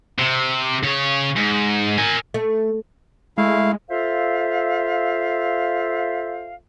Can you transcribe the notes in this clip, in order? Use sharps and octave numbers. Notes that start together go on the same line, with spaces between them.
C3
C#3 C#5
G#2
A#4 G#5
A3
G#3 A3 E4 F5
F4 A4 C5 E5 F5